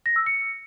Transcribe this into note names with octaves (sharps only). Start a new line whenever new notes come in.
A#6
E6
C#7